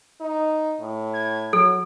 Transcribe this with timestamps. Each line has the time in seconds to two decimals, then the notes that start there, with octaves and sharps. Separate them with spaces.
0.21 D#4
0.80 A2
1.13 G#6
1.53 F#3 A4